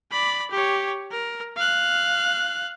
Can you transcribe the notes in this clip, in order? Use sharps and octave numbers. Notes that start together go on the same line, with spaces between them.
D5 B5
G4 C#5
A#4
F5 F#6